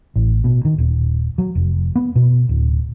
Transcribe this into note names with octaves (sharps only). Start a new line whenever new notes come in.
A1
B2
D#3
D#1
F#3
F1
B3
B2
D1